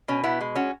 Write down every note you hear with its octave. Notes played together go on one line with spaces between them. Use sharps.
B2 C#4
B3 E4
G#3
C#4 F#4